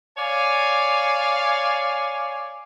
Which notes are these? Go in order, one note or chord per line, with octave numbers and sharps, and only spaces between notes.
C#5 D5 F5 G#5